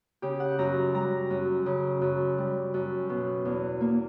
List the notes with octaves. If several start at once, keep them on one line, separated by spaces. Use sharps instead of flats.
C#3 G4
F#5
F#2 A#5
G3 A#5
F#2
C#3
F#2
G3
F#2
B2
E2
A#3